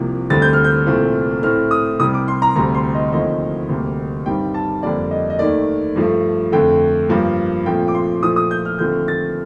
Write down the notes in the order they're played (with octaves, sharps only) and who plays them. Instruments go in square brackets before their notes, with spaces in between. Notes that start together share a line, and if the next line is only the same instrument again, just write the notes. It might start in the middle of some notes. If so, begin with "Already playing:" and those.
Already playing: [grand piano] C2 C3 F3 A#3
D2 D3 G3 C4 A6
G6
F6
G6
C2 A#2 A3 C4
A2 A3 C4 F6
D#6
C2 C3 G3 D#6
D6
C6
A#5
D2 C3 G3 A#5
C6
D#5
D#2 D3 F3 A3 C4 D#5
D2 C3 G3 A#3
G2 D#3 G3 C4 G5
A5
F2 D3 G3 A#3 D5
D#5
D#5
D#2 D#3 A3 D5
G2 F3 A3
F2 D3 A3 G5
G2 F3 A#3
A#2 F3 A3 C4 G5
D6
C6
A#2 F3 A3 D#6
D#6
G6
F6
D#2 D3 F3 A3 C4 G6
A6